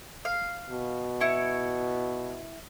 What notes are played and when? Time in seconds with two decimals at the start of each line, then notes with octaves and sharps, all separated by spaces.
0.25 F5
0.70 B2
1.20 E4 C#6